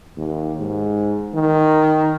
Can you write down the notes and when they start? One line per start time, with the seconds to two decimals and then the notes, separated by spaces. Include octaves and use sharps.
0.17 D#2
0.60 G#2
1.34 D#3